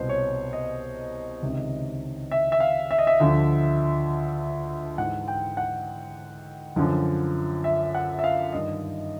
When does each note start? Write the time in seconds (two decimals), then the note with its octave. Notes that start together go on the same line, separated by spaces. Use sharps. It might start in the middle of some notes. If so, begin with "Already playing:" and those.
Already playing: C2 B2 C5
0.09 C#5
0.53 D#5
1.42 C#2 C3 D#3
2.31 E5
2.52 E5
2.60 F5
2.91 E5
2.99 D#5
3.07 E5
3.20 D2 D3 F3
4.98 G#2 E3 F#5
5.28 G5
5.57 F#5
6.76 F#2 D3 F3
7.64 E5
7.95 F#5
8.19 E5
8.24 F5
8.53 G2 D#3 D#5